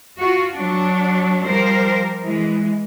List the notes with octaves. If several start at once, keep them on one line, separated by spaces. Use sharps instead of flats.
F4 F#4
F#3 D4
F3 G3 A#4 C5
E3 G#3